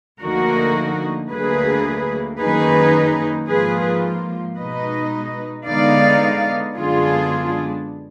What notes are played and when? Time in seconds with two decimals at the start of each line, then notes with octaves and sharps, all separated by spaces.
0.21 D2 D3 F3 A#3 D#4 F#4 A#4
1.30 D2 D3 F#3 A#3 G#4 B4
2.39 F#2 D#3 A#3 D#4 G#4 B4
3.49 G#2 F3 A#3 F4 G#4 B4
4.57 B2 G#3 D#4 B4 D#5
5.67 D3 G#3 B3 D#4 D5 F5
6.76 F#2 D3 G#3 B3 D4 F4 G#4